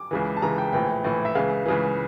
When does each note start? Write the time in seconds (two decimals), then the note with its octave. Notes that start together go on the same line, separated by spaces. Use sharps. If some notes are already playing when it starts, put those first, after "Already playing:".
Already playing: D6
0.11 C#2 C#3 E3
0.37 A5
0.42 C#2 C#3 E3 A#5
0.58 G5
0.73 A#1 A2 E3 G5
1.04 A#1 A2 E3
1.25 E5
1.35 C#2 C#3 E3 F5
1.66 C#2 C#3 E3